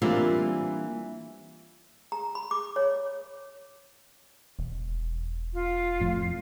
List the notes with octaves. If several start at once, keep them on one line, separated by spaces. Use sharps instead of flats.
E3 G3 A#3 C4 D4 F4
A#5
B5
D6
C#5
E1
F4
F2 A2